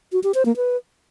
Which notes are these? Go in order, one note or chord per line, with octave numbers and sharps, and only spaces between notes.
F#4
G4
C5
A#3
B4